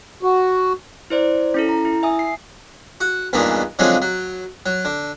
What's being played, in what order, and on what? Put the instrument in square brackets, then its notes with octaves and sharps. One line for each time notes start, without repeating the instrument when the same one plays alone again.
[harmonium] F#4
[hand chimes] E4 C5 D5
C#4 E4 A4
A#5
E4
E5 G#5 D#6
C7
[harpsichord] F#4
E2 G2 A#2 D#3 G#3
D3 F3 F#3 G#3 C4 C#4
F#3
F#3
D3